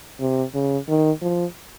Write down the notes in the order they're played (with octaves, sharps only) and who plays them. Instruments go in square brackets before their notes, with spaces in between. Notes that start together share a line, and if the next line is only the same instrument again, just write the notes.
[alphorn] C3
C#3
D#3
F3